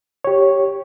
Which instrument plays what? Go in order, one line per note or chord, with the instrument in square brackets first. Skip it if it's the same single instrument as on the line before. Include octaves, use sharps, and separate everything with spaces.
[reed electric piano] G4 C#5